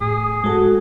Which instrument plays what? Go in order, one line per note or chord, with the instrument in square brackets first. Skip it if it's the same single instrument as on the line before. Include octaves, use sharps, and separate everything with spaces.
[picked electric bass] A2 [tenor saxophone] G#4
[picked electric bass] G#2 [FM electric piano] G#3 A4 [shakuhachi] F#4